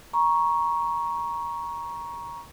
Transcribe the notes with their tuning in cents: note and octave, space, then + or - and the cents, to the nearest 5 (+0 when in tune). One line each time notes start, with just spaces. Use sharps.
A#5 +20 C#6 +0